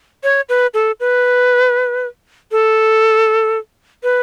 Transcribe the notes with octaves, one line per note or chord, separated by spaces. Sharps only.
C#5
B4
A4
B4
A4
B4